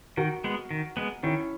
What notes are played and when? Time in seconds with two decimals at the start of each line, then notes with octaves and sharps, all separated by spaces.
0.17 D#3 F#4 A#4
0.44 G#3 B3
0.71 D#3
0.97 G#3 B3
1.23 D#3 C#4 E4